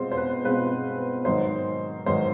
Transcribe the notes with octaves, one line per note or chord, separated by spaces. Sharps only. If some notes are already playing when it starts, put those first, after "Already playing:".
Already playing: B2 G#3 C4 F4 C5
C5
B4
B2 G#3 C4 F4 B4
G#2 D#3 F#3 C5
G#2 D#3 F#3 C5